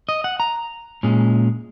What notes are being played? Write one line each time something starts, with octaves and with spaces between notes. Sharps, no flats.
D#5
F#5
A#5
A#2 G#3 C#4